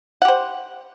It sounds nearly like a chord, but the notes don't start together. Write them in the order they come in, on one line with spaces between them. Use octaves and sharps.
F#5 G4 C5